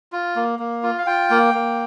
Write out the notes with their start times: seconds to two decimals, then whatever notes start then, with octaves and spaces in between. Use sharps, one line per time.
0.12 F4
0.36 A#3
0.59 A#3
0.83 F4
0.98 F5
1.07 F4 G5
1.30 A#3
1.54 A#3